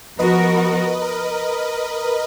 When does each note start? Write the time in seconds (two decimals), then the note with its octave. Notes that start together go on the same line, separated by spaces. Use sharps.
0.19 F3 B3 F#4 A#4 B4 D#5
1.02 A#4